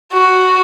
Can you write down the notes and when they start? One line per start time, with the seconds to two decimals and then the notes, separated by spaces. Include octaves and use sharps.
0.13 F#4